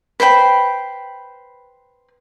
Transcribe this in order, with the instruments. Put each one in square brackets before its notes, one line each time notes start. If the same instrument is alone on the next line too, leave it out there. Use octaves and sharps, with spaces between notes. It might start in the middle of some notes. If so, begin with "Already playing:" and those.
[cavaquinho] B4 C5 G5 B5